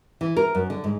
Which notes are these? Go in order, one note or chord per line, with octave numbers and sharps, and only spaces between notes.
E3
A#4
F#2
D3
G#2